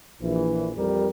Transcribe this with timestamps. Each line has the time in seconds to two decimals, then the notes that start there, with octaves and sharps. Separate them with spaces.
0.21 A#1 E3
0.75 F2 G3 G4 A#4